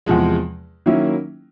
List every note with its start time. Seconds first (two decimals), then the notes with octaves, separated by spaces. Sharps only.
0.06 E2 C3 F3 G#3
0.86 D#3 F#3 A#3 C#4 E4